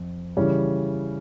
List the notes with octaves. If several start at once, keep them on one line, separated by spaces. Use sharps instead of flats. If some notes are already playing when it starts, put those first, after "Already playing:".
Already playing: F2
C#3 E3 G3 C#4